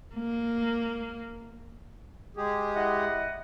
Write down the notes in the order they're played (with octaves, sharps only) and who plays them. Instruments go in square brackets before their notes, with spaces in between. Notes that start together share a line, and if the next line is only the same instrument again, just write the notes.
[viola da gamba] A#3
[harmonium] G#3 G4 G#4
[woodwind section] E4 D#5 F#5